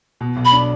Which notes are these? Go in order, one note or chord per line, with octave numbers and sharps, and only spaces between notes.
B2
B1
B5
D4